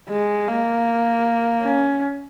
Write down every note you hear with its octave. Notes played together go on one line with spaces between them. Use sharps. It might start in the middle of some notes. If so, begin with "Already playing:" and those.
G#3
A#3
C#4